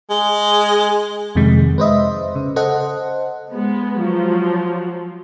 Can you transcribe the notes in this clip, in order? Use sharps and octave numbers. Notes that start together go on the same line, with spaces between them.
G#3
F2 C3 D#3 G#3
B4 C5 D#5 E5
C#3
A4 C5 D#5 F#5
G#3 B3
F3 F#3